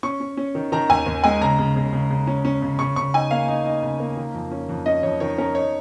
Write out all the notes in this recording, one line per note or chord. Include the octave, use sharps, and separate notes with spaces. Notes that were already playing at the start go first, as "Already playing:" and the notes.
C#4 C#6
C#4
C#4
D#3
D#3 A#5
D#2 G#5
D#2
G#3 G#5
C#3 A#5
C#3
C#3
C#3
C#3
C#4
C#4
C#3
C#3 C#6
C#3 C#6
D#4 G#5
A#3 F5
D#4
D#4
C#3
A#3
D#3
F2
C#4
F2
C#4 D#5
F2 C#5
D#3 C#5
C#4 A#4
D#4 C#5